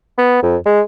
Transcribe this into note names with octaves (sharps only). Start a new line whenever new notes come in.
B3
F2
G#3